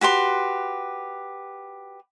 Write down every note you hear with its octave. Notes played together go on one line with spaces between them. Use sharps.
F#4 G4 B4 C6